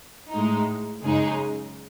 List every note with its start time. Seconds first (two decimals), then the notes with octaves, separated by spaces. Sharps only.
0.31 A2 G#3 D#4
1.04 F#2 C#3 G#3 D#4 G#4